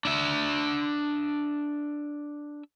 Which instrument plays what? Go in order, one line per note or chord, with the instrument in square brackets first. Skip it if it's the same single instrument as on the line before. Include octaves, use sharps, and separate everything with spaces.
[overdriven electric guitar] D4 E5